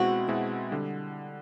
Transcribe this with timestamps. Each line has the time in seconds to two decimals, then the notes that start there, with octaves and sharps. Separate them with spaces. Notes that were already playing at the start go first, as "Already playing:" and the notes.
Already playing: B2 G#3 C4 E4 F#4
0.28 B2 G#3 C4 E4
0.71 D3 G3